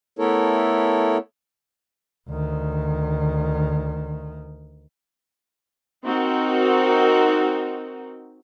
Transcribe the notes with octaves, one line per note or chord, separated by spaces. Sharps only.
A3 B3 E4 A4 A#4 C#5
D2 D#3
C4 D#4 F#4 A#4